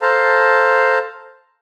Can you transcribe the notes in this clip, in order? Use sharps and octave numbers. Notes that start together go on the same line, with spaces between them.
A4 C5 F5 A5 A#5